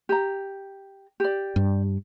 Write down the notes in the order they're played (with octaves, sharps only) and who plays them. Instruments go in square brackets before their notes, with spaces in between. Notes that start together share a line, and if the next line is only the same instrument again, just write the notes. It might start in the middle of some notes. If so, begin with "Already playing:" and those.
[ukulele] G4 A#5
G4 D5
[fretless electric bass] G2